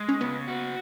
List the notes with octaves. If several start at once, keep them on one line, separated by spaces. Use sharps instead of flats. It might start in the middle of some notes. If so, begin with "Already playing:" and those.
Already playing: G#3
C#4
C#3 B3
F#4